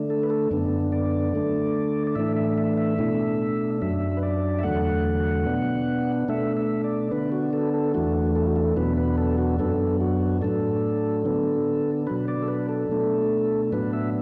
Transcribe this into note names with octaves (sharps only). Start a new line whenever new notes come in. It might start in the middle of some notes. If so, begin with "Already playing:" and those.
Already playing: D3 A3 D4
A4
B4
A4
F#2 D3 B3 D4
D5
D3 A3 D4
D5
A2 E3 A3 D4 E5
E5
E5
E5
B2 A3 D4
F#2 F#3 D4 E5
B4
D5
E5
E2 D3 F#3 A3 F#5
B2 B3 D4
B2 A3 D4 E5
E5
D5
D3 B3 D4 B4
F#4
A4
A4
E2 E3 A3 D4 F#4
A4
F#4
A4
E2 B2 F#3 B3 D4 B4
B4
A4
F#4
F#2 F#3 B3 D4 A4
F#4
A2 F#3 D4 A4
D3 B3 D4
B2 F#3 D4 B4
D5
A4
B4
A4
B2 A3 D4
A2 F#3 B3 D4 B4
E5